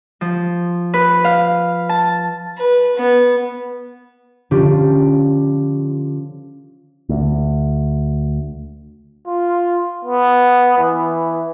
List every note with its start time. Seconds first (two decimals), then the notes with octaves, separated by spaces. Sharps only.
0.21 F3
0.94 B4
1.24 F5
1.89 A5
2.58 B4
2.97 B3
4.51 D3 F3 C#4 D4 F4 G4
7.09 D2
9.27 F4
10.05 B3
10.78 E3